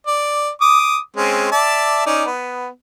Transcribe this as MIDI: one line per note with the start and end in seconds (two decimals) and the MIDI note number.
0.07 0.49 74
0.61 0.98 86
0.61 0.98 87
1.17 1.48 56
1.17 1.48 60
1.17 1.48 61
1.52 2.03 74
1.52 2.03 76
1.52 2.03 81
2.06 2.25 61
2.06 2.25 63
2.06 2.25 74
2.26 2.67 59